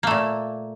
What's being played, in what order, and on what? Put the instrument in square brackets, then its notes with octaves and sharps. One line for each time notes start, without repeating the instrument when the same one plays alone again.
[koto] A#3
A3
A#2